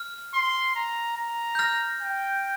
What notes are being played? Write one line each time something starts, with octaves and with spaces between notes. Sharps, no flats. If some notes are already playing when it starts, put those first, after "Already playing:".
Already playing: F6
C6
A#5
A#5
G6
F6 A#6
G5